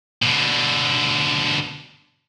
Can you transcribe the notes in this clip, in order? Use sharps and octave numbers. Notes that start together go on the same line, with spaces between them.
B2 D3